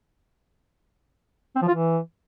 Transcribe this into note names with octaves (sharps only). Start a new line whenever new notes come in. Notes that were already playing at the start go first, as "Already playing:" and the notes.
C4
F3
F4
E3